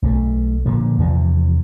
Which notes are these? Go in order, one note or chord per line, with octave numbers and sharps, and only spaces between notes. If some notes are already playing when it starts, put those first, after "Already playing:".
B1 F3 A3
A#2 D3 F3
E2 C3 F3